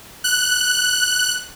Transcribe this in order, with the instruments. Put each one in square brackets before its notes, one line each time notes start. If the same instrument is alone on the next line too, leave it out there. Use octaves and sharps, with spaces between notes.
[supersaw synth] F#6